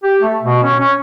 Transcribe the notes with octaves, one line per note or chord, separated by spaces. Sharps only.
G4
A3
B2
C#4
C#4